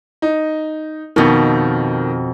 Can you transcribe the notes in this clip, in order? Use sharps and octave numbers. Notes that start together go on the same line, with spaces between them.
D#4
F2 B2 D#3